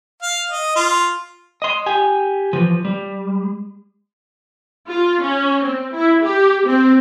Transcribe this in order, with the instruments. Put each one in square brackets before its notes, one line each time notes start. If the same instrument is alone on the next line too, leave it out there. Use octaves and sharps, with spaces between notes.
[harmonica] F5
D#5
F4
[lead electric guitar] D#5 C6
G4 G#5
E3 F3
G3
[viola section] F4
C#4
C4
E4
G4
C4